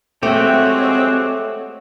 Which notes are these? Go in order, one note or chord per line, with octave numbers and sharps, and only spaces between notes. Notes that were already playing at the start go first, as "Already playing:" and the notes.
G#3 A3 C4 F#4 G4 C#5